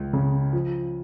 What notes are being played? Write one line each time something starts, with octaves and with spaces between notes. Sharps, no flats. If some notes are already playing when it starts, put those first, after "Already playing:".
Already playing: C#2
C#3
F3